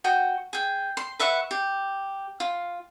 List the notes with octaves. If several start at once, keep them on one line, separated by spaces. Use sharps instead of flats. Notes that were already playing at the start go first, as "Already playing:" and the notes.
F#4 G5 D#6
G#4 G5
C6
B4 E5 F#5 C#6
G4
F4